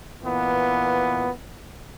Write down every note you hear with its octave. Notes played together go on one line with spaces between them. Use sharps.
A#2 E3 B3